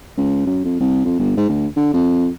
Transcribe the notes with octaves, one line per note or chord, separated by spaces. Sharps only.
C#2
F#2
F2
C2
F2
G1
G#2
D2
D3
F2